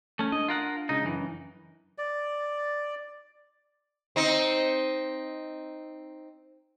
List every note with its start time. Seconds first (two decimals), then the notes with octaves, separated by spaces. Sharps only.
0.19 A3 C#4
0.32 D4 D#5
0.49 F4 A#4 F#5
0.89 C#2 C#3 D#4
1.04 F#2 E3
1.98 D5
4.16 C4 D#4